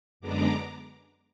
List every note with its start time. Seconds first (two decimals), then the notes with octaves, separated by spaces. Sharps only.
0.20 F#2 D3 G#3 B3 D4 A#5 D6